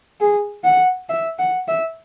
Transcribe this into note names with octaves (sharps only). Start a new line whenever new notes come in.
G#4
F#5
E5
F#5
E5